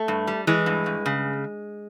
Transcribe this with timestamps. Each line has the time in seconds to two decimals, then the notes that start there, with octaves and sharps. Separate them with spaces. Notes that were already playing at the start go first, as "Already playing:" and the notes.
Already playing: A3
0.08 G2
0.27 G3
0.47 E3 G#3
0.66 G2
0.86 G2
1.06 C#3